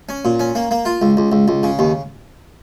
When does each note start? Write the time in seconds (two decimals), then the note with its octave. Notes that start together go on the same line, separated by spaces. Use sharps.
0.09 C#4
0.25 A#2
0.40 C#4
0.55 A#3
0.71 A#3
0.85 F4
1.02 C#2
1.17 C#2
1.32 C#2
1.48 C#2
1.63 C#3
1.79 D#2